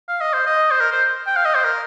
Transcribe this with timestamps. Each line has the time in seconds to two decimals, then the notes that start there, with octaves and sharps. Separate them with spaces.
0.08 F5
0.21 D#5
0.33 C5
0.47 D#5
0.71 C5
0.80 A#4
0.92 C5
1.27 G5
1.36 F5
1.45 D#5
1.55 C5
1.64 A#4